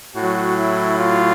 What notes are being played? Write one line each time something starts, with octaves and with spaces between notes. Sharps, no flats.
A2 F#3 F#4
E4
F4